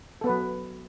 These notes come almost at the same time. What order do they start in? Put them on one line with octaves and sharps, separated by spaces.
A4 B3 B4 F#3